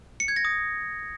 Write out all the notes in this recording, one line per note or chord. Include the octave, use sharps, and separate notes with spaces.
C#7
G#6
A#6
D#6